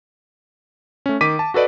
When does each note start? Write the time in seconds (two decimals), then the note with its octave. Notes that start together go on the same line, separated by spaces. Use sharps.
1.06 A3 C#4
1.21 D#3 D6 B6 D#7
1.39 A5
1.54 F#4 A4 B4 D5 D#5